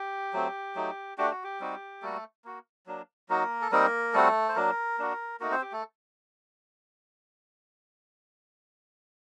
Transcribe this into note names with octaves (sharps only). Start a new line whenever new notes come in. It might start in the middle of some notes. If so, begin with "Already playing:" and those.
Already playing: G4
F#3 A3 C4
F#3 A3 D#4
A3 D4 F#4 G4
F#4
G4
G3 C4 D#4 F#4
G3 A3 A#3 F#4 A4
A#3 F#4
F#3 A#3 D4
F#3 A#3 D#4 F#4 A#4
A4
G3 A#3 C4 D#4 A#4
G3 A3 C4 F#4 A4
C5
F#3 A#3 D4 A#4
A#3 D4 F#4
A3 A#3 D#4 F#4 A#4
C4 C5
G4
A3 A4